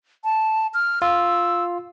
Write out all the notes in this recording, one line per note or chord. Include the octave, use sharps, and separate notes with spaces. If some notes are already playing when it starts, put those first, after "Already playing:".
A5
F6
F4 E6